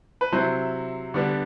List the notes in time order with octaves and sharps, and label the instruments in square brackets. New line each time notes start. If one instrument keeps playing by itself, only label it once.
[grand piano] B4
C3 F#3 C4 E4 C5
D3 G3 B3 D4